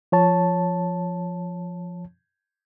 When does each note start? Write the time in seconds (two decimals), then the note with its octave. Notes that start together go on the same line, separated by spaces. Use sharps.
0.12 F3 C#5 A5